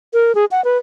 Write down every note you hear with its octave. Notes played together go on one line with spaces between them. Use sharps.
A#4
G#4
F#5
B4